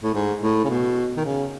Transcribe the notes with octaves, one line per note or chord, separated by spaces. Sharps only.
A2
G#2
A2
C#3
B2
D#3
C#3